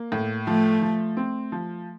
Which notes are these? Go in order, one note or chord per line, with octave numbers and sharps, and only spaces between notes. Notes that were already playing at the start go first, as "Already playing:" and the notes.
Already playing: A#3
A2
F3 A3
F3
C4
F3